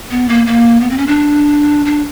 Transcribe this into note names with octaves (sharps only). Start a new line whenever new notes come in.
B3
A#3
A#3
B3
C4
C#4
D4
D4